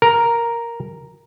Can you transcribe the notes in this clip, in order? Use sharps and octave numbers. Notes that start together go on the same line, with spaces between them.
A#4